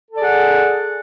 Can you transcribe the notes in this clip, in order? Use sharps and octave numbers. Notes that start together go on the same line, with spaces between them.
G#4 A4 D5 F#5